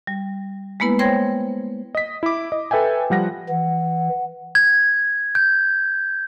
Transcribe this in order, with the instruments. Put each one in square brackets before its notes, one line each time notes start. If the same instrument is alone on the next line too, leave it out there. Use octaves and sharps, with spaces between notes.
[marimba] G3
G#3 A#3 B3 E4 B4
C5 C#5 G5 C6 G#6 A#6
[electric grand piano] D#5 B6
E4 D6
D#5
A4 B4 E5 G5 G#5
F3 G3 F#5 A#6
[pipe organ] E3 [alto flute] F#5
[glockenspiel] G#6
G6